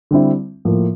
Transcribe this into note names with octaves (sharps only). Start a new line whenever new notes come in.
D3 G3 C4 E4
A2 F3 A#3